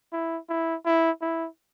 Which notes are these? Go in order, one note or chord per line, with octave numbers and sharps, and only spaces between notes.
E4
E4
E4
E4